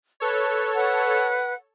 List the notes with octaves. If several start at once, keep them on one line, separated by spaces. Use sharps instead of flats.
A4 B4 C#5
B4 F#5